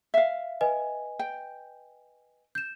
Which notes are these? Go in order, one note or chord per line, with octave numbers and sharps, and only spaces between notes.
E5 F5
B4 D#5 G#5
G5
G6 E7